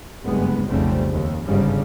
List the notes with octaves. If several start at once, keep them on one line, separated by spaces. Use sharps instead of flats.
F#1 D2 G2 G#3 B3
F1 B1 C#3 G3 A3 C4
D#2
G1 G#2 C#3 G3